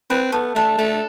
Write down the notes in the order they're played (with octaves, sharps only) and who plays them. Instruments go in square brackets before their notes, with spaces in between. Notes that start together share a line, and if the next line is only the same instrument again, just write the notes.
[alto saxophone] C4 [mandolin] B4
[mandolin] A3 [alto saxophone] B3
[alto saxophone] A3 [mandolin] D4
[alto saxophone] A3 [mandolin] A4